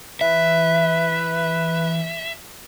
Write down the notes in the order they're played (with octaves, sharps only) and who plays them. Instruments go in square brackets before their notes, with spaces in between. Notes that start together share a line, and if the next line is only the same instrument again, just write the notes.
[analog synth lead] E3 [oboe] B4 [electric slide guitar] E5